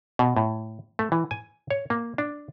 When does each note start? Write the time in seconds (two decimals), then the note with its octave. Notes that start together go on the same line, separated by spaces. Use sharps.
0.19 B2
0.37 A2
0.99 A3
1.12 E3
1.31 G#5
1.71 C#5
1.90 A#3
2.18 D4